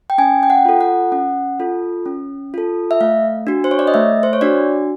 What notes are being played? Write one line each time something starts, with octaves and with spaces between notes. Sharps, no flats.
G5
C#4 G#5
G5
F#5
F4 A4
F#5
C#4 F#5
F4 A4
C#4
F4 A4
E5
A3 F5
D4 F#4
C5
C#5
D5
D#5
A3 E5
C5
C#5
D4 F#4 D5